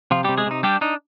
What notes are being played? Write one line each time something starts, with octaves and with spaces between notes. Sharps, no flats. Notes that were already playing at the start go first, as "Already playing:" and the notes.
C3 F3 F4
G3 G4
C3
G#3 G#4
C3 D#4
G3 D4 G4
D4 D#4